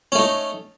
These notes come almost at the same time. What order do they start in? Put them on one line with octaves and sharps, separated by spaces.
C#4 A3 D#4